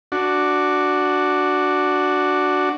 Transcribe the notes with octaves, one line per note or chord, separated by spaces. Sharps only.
D4 F#4